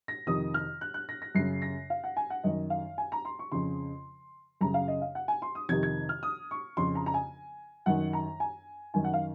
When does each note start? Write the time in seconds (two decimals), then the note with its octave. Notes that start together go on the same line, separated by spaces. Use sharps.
0.08 A#6
0.27 F2 C3 D#3 D#6
0.54 F6
0.81 F#6
0.94 F#6
1.09 A#6
1.22 A#6
1.35 F#2 C#3 C7
1.62 A#6
1.90 F5
2.04 F#5
2.17 G#5
2.30 F#5
2.44 F#2 D#3 D#5
2.70 F5
2.98 G#5
3.12 A#5
3.25 C6
3.39 C#6
3.52 F2 C#3 C6
4.61 F#2 C#3 A#5
4.74 F5
4.88 D#5
5.02 F5
5.15 F#5
5.28 G#5
5.42 C6
5.55 D#6
5.69 F2 C3 D#3 G#6
5.83 G#6
6.09 F6
6.23 D#6
6.51 C#6
6.77 F2 C#3 C6
6.95 A#5
7.06 A#5
7.14 G#5
7.86 F#2 D#3 F#5
8.13 A#5
8.40 G#5
8.94 F#2 D#3 G#5
9.04 F#5
9.14 F5